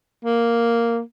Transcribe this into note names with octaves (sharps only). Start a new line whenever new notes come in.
A#3